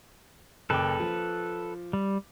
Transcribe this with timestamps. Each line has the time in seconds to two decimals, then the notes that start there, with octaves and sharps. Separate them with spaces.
0.70 F#1 A4 B4 G5 D6
1.00 F3
1.93 G3